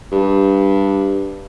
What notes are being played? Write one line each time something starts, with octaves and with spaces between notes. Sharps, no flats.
G2